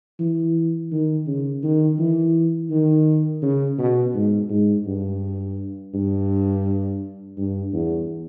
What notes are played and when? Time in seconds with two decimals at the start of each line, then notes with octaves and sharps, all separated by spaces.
0.20 E3
0.91 D#3
1.27 C#3
1.63 D#3
1.99 E3
2.70 D#3
3.42 C#3
3.79 B2
4.14 G#2
4.50 G#2
4.86 G2
5.94 G2
7.38 G2
7.73 E2